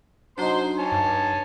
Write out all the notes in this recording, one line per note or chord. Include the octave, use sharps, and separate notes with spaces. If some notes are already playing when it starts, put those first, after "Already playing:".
F#3 D4 D#4 C5 C6
C#5 G#5 A5
G2